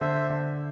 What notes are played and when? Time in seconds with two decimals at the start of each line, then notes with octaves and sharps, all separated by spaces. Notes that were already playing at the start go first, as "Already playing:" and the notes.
0.01 D3 C5 E5
0.30 D3